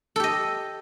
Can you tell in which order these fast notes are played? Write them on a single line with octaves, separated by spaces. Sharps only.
A4 G4 D#5